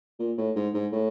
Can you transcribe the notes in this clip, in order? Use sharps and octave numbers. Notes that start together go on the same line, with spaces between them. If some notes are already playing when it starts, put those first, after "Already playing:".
A#2
A2
G#2
G#2
A2